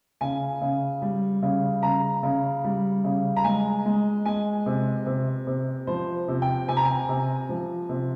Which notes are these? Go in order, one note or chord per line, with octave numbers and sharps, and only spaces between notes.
C#3 G#5
C#3
G3
C#3
C#3 A#5
C#3
G3
C#3
A#5
G#3 G#5
G#3
G#3 G#5
C3
C3
C3
F3 C5
C3
G5
C3 G#5
A#5
G#5
C3
F3
C3